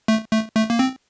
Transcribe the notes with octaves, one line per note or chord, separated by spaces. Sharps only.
A3
A3
A3
A#3
C4